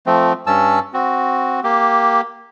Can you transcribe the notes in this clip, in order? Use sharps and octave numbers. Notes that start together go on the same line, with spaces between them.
F3 A3 C4
G2 C#4 A5 E6
C4 F#4
A#3 G4